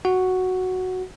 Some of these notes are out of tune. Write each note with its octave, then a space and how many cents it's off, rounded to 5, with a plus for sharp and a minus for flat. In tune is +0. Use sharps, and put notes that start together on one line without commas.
F#4 +0 F#5 +0